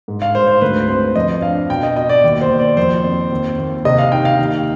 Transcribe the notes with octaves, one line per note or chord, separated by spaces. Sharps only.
G#2
F5
G#2 C5
C5
D2 B4
C4 C5
F2 D#5
D4 F5
B2 G5
D#5
B2 D#5
D5
D#2
C5
D#2
D5
F2 C5
C4
D#2
D#2
C3 D#5
F5
D#4 G5
F5
D#2